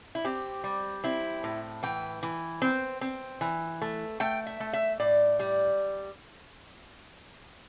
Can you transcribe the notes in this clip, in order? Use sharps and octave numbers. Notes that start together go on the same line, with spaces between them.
E4
C4 G4
G3
C4 E4
A2
E3 G5
E3
C4
C4
E3
A3
A3 G5
E5
A3
E5
A2 D5
G3